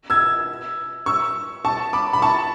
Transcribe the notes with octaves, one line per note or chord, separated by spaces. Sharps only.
E6 G#6
C#6 E6
A5 C#6
B5 D6
B5
A5 C#6